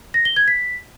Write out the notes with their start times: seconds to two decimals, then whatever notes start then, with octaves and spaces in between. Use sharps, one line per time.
0.14 A#6
0.25 G7
0.36 G#6
0.48 B6